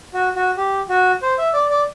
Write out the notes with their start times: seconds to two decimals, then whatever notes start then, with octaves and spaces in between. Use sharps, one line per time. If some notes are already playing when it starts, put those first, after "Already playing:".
0.14 F#4
0.36 F#4
0.57 G4
0.89 F#4
1.22 C5
1.38 E5
1.53 D5
1.70 D5